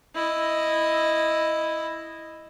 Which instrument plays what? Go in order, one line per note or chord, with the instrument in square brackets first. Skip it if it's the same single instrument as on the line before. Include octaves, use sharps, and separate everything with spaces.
[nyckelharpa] E4 D#5